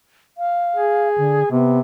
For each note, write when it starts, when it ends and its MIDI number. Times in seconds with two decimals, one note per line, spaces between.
0.38 1.08 77
0.76 1.46 68
1.18 1.43 50
1.51 1.81 48
1.51 1.80 59